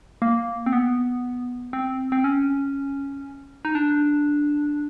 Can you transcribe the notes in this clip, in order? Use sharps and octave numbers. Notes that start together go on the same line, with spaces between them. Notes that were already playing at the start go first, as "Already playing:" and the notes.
A#3
C4
B3
C4
C4
C#4
D#4
D4